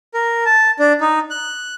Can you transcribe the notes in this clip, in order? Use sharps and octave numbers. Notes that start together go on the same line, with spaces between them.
A#4
A5
D4
D#4
F#6